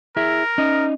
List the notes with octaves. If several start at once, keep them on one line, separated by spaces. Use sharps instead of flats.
E4 G#4 A#4 E5
C#4 D#4 D#5